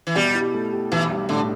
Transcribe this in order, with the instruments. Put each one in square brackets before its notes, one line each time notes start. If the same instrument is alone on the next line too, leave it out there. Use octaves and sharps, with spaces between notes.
[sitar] E3
[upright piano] B2 [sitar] G3
[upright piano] E4
A3
G4
[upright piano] B1 [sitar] E3
[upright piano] G3
[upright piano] A2 [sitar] D3